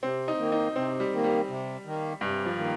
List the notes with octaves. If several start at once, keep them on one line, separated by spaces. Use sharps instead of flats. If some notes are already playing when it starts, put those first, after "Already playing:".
C3 C4
D#4
D#3 A#3
D#4
C3 C4
G3
D#3 A#3
G3
C3
D#3 A#3
G2 C3
F3
D#3 A#3